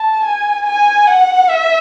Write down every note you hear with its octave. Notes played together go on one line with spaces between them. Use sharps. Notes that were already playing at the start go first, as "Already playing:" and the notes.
Already playing: A5
G#5
G#5
F#5
E5